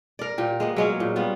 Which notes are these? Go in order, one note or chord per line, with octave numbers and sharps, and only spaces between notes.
A#4 D5
A#2 G4
G#3 A#3 B3
F#3 G#3 C#4
A#2
G3 B3 F4